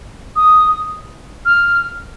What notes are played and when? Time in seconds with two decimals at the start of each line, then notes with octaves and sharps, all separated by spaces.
0.36 D#6
1.45 F6